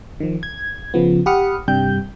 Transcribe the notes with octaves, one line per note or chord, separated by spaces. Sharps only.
D#3 F3
G#6
C#3 F3 B3
G4 F#5 B5 D#6 F6 C#7
G2 C3 G3 G5 G6